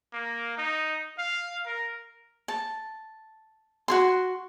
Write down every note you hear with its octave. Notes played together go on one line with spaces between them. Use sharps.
A#3
D#4
F5
A#4
A5
F#4 G#4 C6